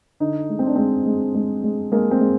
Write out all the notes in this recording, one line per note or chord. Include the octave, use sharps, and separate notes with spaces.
D3 D#4
G#3
C4
D4
G#3 C4
G#3
G#3
G#3
G#3 A#3
C4
G#3